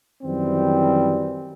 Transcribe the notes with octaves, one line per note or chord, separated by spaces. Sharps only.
F#2 D#3 E3 G3 C4